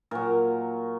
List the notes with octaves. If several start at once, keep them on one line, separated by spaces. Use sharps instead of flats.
A#2 F#3 A#4